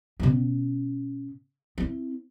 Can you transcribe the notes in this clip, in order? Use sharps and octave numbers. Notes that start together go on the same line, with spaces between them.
B2 C#4
C4 E4